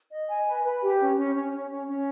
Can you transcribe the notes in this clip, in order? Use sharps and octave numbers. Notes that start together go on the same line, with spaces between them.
D#5
G#5
B4
B4
G4
C#4
C#4
C#4
C#4
C#4
C#4